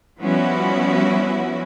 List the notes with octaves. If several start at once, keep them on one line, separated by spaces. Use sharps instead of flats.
F3 G3 B3 C#4 E4 F#4